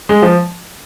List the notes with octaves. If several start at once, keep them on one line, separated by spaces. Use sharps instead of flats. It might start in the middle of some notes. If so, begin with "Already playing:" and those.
G#3
F3